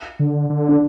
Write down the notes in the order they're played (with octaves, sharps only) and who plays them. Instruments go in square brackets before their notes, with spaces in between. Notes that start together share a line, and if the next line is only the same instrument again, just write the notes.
[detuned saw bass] D3
D3
[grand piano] D4